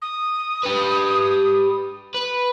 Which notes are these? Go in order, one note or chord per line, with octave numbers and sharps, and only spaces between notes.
D#6
G4 B4
B4